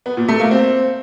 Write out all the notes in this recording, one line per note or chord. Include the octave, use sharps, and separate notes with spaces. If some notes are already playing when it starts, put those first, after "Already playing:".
B3
A#2
A3
A#3
C4